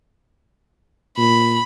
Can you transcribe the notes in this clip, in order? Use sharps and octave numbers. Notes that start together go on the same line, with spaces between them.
A#2 B5